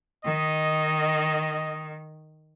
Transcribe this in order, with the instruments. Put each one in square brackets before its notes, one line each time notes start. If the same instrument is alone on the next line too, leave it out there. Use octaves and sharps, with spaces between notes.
[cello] D#3 [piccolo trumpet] D#5